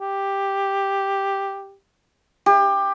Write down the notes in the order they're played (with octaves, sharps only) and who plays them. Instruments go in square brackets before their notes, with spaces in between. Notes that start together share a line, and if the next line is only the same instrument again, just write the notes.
[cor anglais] G4
[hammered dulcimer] G4